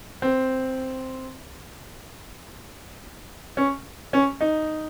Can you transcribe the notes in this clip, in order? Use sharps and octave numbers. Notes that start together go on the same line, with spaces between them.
C4
C#4
C#4
D#4